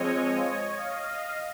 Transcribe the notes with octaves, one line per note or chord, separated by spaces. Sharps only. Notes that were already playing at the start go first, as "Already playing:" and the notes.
Already playing: F3 G#3 C4 C#5 D#5
D#5 F5